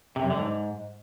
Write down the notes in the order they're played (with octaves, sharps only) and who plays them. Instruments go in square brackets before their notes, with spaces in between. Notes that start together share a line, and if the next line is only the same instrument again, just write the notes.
[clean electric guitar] C3
F#2
D3
G#2